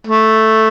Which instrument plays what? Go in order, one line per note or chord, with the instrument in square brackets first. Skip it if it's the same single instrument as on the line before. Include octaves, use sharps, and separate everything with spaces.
[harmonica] A3